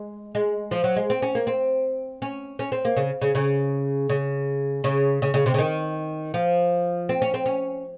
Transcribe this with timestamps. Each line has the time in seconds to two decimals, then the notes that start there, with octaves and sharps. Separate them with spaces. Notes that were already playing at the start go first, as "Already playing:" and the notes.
Already playing: G#3
0.35 G#3
0.71 F3
0.84 F#3
0.96 G#3
1.10 C4
1.22 C#4
1.35 A#3
1.47 C4
2.22 C#4
2.59 C#4
2.72 C4
2.85 A#3
2.96 C#3
3.22 C#3
3.35 C#3
4.09 C#3
4.84 C#3
5.22 C#3
5.34 C#3
5.46 C3
5.54 C#3
5.58 D#3
6.34 F3
7.09 C4
7.22 C#4
7.34 C4
7.46 C#4